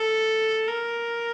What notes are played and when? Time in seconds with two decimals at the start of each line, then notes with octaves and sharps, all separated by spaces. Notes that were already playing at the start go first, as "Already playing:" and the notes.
Already playing: A4
0.68 A#4